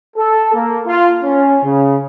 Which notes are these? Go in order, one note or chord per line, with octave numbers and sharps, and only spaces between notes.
A4
A#3
F4
C#4
C#3